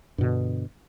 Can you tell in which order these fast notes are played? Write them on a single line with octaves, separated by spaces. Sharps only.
G2 B2 D3